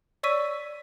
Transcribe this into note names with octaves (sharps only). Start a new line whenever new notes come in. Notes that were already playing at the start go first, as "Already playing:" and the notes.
C#5 D5 C#6 E6 B6 D#7